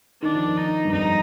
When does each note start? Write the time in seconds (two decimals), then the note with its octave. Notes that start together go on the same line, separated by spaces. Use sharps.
0.22 D#3 D4
0.35 F3
0.48 D#3
0.57 D#4
0.85 G2
0.92 F2 D#4